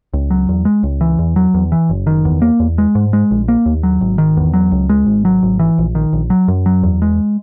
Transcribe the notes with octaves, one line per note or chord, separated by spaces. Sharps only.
C#2
F#3
E2
G#3
C#2
E3
E2
F#3
E2
E3
F#1
D#3
E2
A#3
E2
G#3
G#2
G#3
A#1
A#3
D#2
F#3
G#1
D#3
E2
F#3
C#2
G#3
G#1
F#3
G#1
E3
A#1
D#3
A#1
F#3
F#2
F#3
E2
G#3